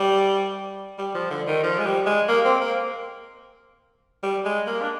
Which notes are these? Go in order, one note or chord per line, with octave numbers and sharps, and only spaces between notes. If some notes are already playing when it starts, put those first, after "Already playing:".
Already playing: G3
G3
F3
D3
D#3
F3
G#3
G3
G#3
A#3
C4
A#3
G3
G#3
A#3
D4